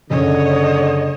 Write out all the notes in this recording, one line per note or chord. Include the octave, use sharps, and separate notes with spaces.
F#1 D3 C#5 D#5